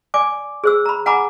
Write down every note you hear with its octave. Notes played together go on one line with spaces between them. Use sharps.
D5 G#5 D6
G#4 C5 E6
A#5 B5
F#5 G#5 A#5 B5 D6